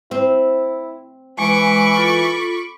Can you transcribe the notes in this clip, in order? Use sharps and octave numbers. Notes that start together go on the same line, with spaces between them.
C4 E4
E3 G#3 B5 C#6 D6
F4 A4